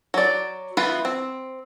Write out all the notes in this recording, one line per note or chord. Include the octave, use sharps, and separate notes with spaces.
F#3 D5
E3 B3 F4 F#5 B5
C4